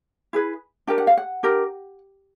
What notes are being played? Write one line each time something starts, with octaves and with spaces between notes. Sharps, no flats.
E4 G#4 B4
D4 G4 A#4 G5
F#5
F5
F#5
D4 G4 A#4